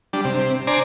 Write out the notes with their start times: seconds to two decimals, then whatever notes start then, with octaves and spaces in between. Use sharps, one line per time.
0.13 G3 D4
0.25 C3
0.67 D4 C5 D5 G#5 A#5